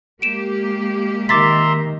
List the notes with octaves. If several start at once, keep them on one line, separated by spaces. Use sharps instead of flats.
G#3 A#3 G4 D7 E7
D#3 E5 A#5 C6 D6 A6 B6